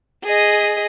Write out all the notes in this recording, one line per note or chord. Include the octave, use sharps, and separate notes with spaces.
G#4 D#5